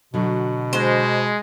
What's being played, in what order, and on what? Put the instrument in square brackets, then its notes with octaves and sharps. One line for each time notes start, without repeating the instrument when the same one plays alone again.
[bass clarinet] B2 [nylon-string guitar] D3 F#3
[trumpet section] G#3 [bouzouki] C5